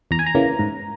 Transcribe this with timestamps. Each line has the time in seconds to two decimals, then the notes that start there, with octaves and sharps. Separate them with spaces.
0.11 E2 A#5
0.19 G#5
0.27 A#5
0.35 C#3 E3 A#3
0.59 G#2